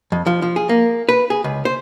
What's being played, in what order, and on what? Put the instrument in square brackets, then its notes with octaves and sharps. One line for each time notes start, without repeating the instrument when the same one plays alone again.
[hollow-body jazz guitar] F2
F3
F3
G#4
A#3
B4
G#4
C#2
C5